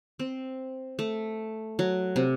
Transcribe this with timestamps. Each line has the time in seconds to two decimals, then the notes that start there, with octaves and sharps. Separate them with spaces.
0.19 C4
0.99 A3
1.79 F#3
2.16 C3